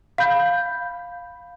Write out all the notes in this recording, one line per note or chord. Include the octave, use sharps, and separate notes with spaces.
F5 B5 G6